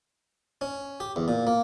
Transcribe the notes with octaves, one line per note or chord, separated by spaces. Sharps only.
C#4
G4
E2
A#2
A#3